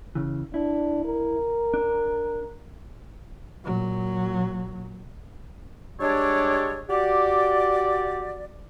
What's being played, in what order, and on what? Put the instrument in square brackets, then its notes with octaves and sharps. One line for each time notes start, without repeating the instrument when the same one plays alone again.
[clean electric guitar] C#3 E3
[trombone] D4 [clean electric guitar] E4
[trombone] A#4
[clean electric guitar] D4
[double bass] A#2 F#3
[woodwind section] G3 G#3 D4 G4 A4 C#5
F#4 G4 D5